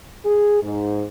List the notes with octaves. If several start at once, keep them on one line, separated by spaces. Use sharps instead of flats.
G#4
G#2